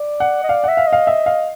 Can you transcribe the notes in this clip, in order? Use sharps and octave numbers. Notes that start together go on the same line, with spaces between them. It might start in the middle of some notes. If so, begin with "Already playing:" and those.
Already playing: D5
F#5
D#5
D5 F5
E5 F#5
F5
D#5 F5
E5
F5